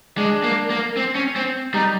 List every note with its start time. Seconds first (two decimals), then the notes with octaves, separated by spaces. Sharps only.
0.17 G#3 D4
0.44 A#3
0.70 A#3
0.97 C4
1.15 C#4
1.36 C4
1.74 G3 D#4